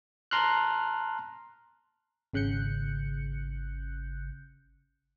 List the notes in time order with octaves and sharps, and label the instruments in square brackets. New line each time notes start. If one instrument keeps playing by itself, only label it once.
[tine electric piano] A5 A#5 C6 F6 F#6
[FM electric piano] G#1 C#3 F#6 G6 C#7